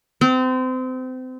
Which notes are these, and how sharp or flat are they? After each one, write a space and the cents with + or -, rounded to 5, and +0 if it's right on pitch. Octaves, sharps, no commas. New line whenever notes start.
C4 -30